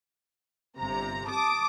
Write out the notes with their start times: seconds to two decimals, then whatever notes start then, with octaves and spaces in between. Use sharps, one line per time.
0.78 G1 C3 A#5
1.27 A5 D6 D#6